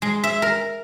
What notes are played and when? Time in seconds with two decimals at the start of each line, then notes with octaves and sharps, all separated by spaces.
0.02 G#3
0.24 E5
0.42 A#4